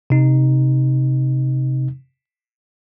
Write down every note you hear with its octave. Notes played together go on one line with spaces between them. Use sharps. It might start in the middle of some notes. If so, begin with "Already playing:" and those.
C3 D#4